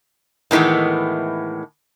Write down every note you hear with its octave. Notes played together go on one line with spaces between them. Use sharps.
A2 D#3 E3 G#3 B3